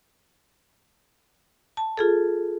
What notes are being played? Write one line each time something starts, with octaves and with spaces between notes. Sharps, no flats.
A5
F4 G#4 A4